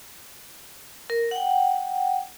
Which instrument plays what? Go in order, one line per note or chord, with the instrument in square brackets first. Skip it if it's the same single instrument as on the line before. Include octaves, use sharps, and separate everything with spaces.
[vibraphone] A#4
F#5 G5